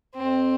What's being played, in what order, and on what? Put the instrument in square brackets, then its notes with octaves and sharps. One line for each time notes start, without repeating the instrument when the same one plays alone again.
[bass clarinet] F2 [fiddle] C4